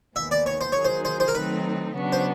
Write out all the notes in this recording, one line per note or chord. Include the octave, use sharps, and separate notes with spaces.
D#2 D#3 G#3 B3 E5
D5
C#5
C5
D#3 F#3 A#3 D#4 G#4 C#5
C5
C5
C5
A#4
D#3 F#3 A3 C4 D#4 B4
C#3 F#3 B3 D4 F#4
C5